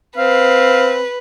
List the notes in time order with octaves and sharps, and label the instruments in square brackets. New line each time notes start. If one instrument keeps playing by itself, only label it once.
[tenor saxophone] C4 [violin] B4 [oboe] F5